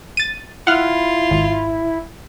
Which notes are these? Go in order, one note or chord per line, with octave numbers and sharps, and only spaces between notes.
A6 D#7
E4 F4 F#5 F6
G#1